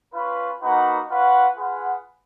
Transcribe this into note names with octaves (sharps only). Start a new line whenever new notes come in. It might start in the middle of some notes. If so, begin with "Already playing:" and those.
C#4 F4 B4
A#3 D#4 F#4 B4 F#5
C#4 F4 B4 F#5
F4 G#4 B4 F#5